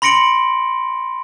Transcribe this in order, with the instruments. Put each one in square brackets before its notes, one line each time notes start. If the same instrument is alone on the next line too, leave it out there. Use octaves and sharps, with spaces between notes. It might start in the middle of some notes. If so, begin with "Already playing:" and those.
[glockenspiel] B5 C6 A#6 C#7 D7 F#7